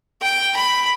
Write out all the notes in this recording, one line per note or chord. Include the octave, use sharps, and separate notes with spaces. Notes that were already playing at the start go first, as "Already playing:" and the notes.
G5
B5